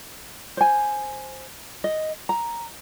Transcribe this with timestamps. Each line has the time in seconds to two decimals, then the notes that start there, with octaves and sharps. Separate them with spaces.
0.57 C5 G#5
1.84 D#5
2.29 A#5